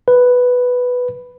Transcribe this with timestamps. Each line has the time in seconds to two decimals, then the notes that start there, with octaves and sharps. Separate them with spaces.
0.08 B4